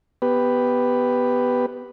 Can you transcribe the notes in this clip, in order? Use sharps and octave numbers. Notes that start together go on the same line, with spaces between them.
B3 G4 B4